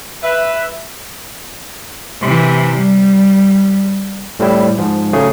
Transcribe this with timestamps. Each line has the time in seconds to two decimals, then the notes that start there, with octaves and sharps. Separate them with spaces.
0.23 B4 E5
2.22 C3 E3
2.78 G3
4.39 A2 G3 C4 E4
4.78 G#2 F3
5.13 C#3 F#3 A3 G#4